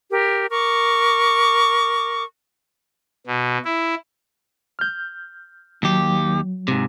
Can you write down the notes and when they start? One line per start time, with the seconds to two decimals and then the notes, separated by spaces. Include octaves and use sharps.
0.11 G4 A#4
0.50 A#4 C#6 D6
3.27 B2
3.65 E4
4.79 F6 G6
5.83 D#2 F#3 G4
6.68 G#2 C3